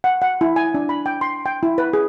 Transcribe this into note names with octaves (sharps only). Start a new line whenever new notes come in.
F#5
F#5
E4
G#5
D4
B5
G5
C6
G5
E4
B4
G#4